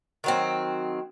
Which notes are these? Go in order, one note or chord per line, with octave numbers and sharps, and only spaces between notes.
D#3 F#3 C4